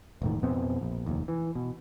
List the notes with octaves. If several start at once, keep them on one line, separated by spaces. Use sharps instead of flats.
E1 A2 D#3
F2 B2 B3 C4
A#1
F1 D#2
E3
B2